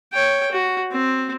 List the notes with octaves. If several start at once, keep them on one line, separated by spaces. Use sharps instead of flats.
C#5 G5
F#4
C4